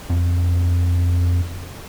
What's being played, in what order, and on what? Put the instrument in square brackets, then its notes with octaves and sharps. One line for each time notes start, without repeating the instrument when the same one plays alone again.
[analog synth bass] F2